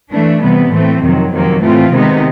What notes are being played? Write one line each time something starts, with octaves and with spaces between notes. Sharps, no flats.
E3 A3 D4
C3 E3 G3 B3
A2 E3 A3 C4
F2 C3 D#3 F#3
F2 C3 D#3 F#3 A#3
A2 E3 A3 C4 F4
C3 D#3 G#3 B3 D#4